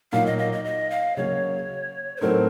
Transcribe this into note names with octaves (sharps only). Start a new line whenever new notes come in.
A#2 F#3 A#3 D#4 F5
D#5
D#5
D#5
D#5
F5
C#3 F#3 A#3 C#4 C#5
C5
A2 F#3 A3 C4 D#4 A#4